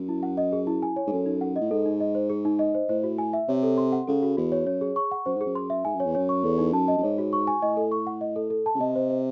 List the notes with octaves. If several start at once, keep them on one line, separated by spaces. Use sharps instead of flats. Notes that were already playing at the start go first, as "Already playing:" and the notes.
Already playing: F#2
E4
F#5
D#5
G#4
E4
G#5
C#5
G#2
F#2 A4
D#4
F#5
A2 D#5
G#2 A4
D#4
D#5
C5
G#4
D#4
D#5
C5
A2 C5
F#4
G#5
E5
C3 C#5
A4
C6
F#5
C#3 A4
F#4
E2 F#4
C#5
F#2 C#5
G#4
C#6
F#5
F#2 C5
G#2 G#4
F#2
C6
E5
G#2 G#5
F#2 C#5
E2
F#2 C#5
C#6
E2 A4
D#4
F#2 A5
D#5
F#2
G#2 C#5
F#4
C#6
G#5
A2 D#5
A4
C#6
F#5
D#5
A4
A4
A5
C#3
C3 D#5
C5
C5